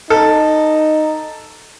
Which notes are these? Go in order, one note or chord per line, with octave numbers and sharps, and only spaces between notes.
D#4 A4